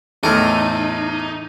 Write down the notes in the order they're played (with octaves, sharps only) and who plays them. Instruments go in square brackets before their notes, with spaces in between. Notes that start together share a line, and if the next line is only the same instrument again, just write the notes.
[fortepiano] E2 A2 [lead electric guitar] D#4 [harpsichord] A4 A#4